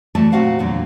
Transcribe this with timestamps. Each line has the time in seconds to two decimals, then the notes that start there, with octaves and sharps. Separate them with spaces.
0.15 E3 A3 F#4 D5 A5
0.32 A#2 C4 F#4 F5 F#5
0.59 E2 A#2 D3 F#3